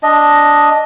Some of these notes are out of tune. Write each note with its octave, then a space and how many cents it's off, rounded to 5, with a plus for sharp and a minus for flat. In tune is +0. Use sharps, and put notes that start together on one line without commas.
D4 +0 D#5 +0